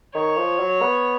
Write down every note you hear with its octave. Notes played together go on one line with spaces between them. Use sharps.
D#3 C#5
F3
F#3
B3